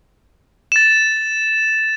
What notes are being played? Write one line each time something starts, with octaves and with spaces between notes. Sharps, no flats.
A6 E7